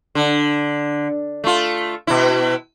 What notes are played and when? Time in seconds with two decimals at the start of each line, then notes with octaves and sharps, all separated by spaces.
0.15 D3
1.44 A3 F4
2.07 B2 E4